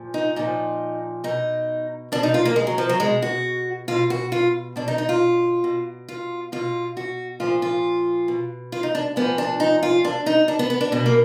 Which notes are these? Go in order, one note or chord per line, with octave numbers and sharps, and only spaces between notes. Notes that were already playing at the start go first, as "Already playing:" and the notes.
Already playing: A#2 F3
D#4
A#2 F3 D#4
B2 D#4
B2 D4
D#4
F4
A#3
G#3
F#3
F3
F#3
B2 G#3
F#4
B2 F4
F#4
F4
B2 D4
D#4
D#4
F4
B2
F4
B2 F4
F#4
A#2 F3 F4
F4
B2
F4
D#4
D4
A#2 F3 B3
D4
D#4
F4
B2 D4
D#4
D4
B3
B3
D4
B2 B3
A#3